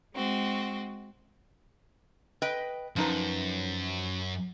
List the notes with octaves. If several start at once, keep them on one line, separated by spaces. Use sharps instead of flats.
G#3 C4 F#4
B4 D#5 G5
F#2 F3 D#4 B4